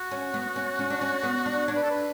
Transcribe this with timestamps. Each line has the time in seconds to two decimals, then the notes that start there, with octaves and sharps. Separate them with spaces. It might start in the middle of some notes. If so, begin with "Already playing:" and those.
Already playing: F#4
0.11 C#4
0.34 B3
0.56 C#4
0.79 C#4
0.90 D4
1.01 C#4
1.23 B3
1.46 D4
1.67 D4 C#5
1.76 B4
1.83 A4
1.90 B4